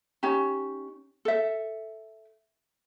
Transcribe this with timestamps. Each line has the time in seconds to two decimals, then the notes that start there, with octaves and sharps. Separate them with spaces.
0.23 C#4 D#4 G4
1.25 A4 E5